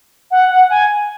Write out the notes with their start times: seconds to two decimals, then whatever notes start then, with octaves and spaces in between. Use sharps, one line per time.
0.31 F#5
0.50 F#5
0.70 G#5